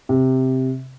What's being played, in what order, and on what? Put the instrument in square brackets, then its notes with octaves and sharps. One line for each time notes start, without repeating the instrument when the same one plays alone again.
[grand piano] C3